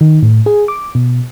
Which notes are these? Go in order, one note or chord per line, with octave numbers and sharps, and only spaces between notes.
D#3
A2
G#4
D6
B2